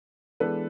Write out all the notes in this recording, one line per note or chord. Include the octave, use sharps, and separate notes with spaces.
E3 G#3 B3 D4 A4 B4